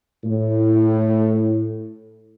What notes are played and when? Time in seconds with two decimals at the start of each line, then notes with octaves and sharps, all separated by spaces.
0.24 A2